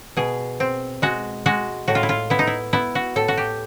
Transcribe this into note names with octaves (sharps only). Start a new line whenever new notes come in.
B2 G#4
C4
G#3 F#4
G#3 F#4
A2 F#4
F4
E4
F4
B3 E4
D#4
E4
B3 E4
F#4
A2 A4
F#4
G4